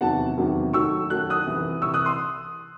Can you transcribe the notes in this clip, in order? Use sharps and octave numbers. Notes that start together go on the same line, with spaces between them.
E2 C3 D#3 F#3 F#5 A5
E2 C3 D#3 F#3
F#2 D#3 F#3 A3 C#6 E6
F#2 D#3 F#3 A3 F#6
D#6 F#6
C2 C3 E3
C2 C3 E3 C#6 E6
D#6 F#6
C6 D#6